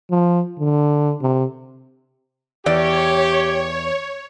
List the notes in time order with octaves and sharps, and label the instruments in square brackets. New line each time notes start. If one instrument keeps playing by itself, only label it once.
[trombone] F3
D3
C3
[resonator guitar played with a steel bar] E2 D5 [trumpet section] G4 [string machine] C#5